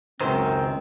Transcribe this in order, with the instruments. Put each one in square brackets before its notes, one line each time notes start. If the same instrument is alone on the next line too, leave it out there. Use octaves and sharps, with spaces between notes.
[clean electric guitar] C#2 D#3 [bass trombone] F#2 [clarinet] C4 [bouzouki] C5